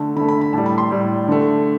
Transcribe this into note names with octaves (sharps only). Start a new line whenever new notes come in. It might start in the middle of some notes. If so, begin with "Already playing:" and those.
Already playing: D3 A3
D3 A3 B5
B5
B5
A2 G3 A5
B5
C6
A2 G3
D3 A3